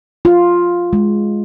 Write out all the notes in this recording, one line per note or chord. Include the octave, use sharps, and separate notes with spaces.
F4
G#3